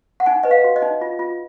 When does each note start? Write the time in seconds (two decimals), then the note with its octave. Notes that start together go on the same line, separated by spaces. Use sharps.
0.20 F#5
0.26 D#4 G#5
0.43 B4 D#5
0.51 F5
0.64 F#4
0.76 D#5
0.82 D#4
1.01 F4
1.19 F4